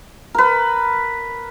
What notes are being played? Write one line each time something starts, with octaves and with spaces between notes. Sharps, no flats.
A#4 B4